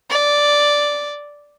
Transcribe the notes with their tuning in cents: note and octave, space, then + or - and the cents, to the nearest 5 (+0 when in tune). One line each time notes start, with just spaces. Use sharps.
D5 -5